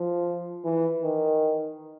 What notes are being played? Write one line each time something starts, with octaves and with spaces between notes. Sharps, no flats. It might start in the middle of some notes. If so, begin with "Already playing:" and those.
Already playing: F3
E3
D#3